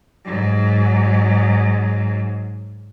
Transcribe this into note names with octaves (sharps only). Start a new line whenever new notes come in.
G#2 F#3